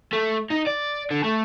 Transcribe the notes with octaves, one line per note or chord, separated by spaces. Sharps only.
A3
D#4
D5
D3
A3